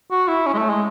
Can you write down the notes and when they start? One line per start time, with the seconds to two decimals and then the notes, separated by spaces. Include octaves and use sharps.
0.11 F#4
0.28 E4
0.46 C#4
0.54 G#3
0.58 A3
0.70 G#3